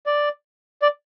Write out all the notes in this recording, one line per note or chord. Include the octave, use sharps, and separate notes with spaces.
D5
D5